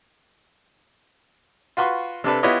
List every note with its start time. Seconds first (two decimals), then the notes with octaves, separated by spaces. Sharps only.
1.77 F4 F#4 B4 C6 C#6
2.24 C3 D4 A4 B4
2.43 B3 E4 F4 G4 C#5 D#5